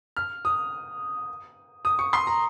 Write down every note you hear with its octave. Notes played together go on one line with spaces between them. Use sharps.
F6
D#6
D#6
C#6
C6
A#5